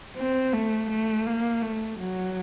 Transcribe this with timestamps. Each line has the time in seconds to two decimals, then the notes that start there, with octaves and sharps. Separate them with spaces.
0.16 C4
0.53 A3
0.90 A3
1.27 A#3
1.62 A3
2.00 F#3